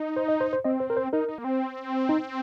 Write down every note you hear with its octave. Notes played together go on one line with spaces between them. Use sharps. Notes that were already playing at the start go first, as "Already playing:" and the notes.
Already playing: D#4
C5
D#5
C5
C5
C4 D#5
C5
A#4
C5
D#4 A#4
D#4
A#3
C4
D#4